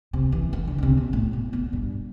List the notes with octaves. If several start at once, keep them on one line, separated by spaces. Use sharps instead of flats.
C3
E3
E3
D3
D3
C3
B2
A2
B2
B2
G2